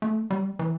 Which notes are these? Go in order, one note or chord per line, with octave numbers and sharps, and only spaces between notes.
A3
G3
E3